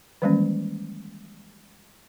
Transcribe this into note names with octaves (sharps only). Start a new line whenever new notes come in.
D#3 E3 G3 G#3 A#3 C#4